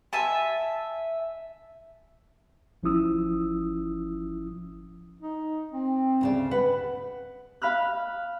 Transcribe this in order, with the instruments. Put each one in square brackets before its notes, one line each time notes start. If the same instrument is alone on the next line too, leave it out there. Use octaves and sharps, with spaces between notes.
[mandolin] E5 G#5 A5
[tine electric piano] G1 F3 C#4 E4 D#6 E6
[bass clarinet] D#4
C4
[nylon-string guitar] D2 C#3 D5
B4 F#5
[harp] F5 B5 F6 F#6